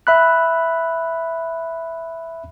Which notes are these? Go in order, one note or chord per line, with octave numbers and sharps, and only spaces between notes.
E5 B5 F#6